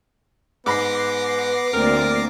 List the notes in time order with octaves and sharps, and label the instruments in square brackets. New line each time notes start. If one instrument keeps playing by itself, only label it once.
[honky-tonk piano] G#2 B5 [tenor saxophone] B3 [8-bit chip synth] D6 A#6 C7
[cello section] D2 A#3 D5 [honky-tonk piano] C4 [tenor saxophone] A#4